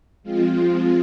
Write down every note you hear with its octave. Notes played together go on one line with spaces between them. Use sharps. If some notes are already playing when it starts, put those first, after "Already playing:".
F3 G#3 C4 F4